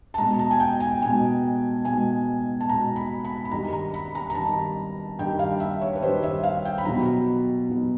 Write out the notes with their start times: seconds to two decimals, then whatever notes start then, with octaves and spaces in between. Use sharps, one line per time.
0.14 A5
0.18 B2 G#3 A#5
0.39 A5
0.51 G#5
0.60 G5
0.80 G#5
1.01 B2 G#3 G#5
1.85 B2 G#3 G#5
2.61 A5
2.69 B2 G#3 A#5
2.96 B5
3.25 B5
3.45 B5
3.51 G2 D#3 G3 A#5
3.73 A#5
3.94 B5
4.15 A#5
4.30 A#5
4.35 G2 D#3 G3 A5
5.19 G2 D#3 G3 G5
5.39 F5
5.60 E5
5.82 C#5
5.95 B4
6.02 G2 D#3 G3 C5
6.23 E5
6.44 F5
6.65 G5
6.78 B5
6.85 B2 F#3 A#5
7.70 B2 F#3